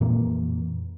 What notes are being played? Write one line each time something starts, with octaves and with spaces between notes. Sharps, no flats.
F2 A#2 E3 A#3